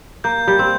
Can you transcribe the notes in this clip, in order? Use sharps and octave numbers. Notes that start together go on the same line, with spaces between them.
A#3 G6
G3 G6
C4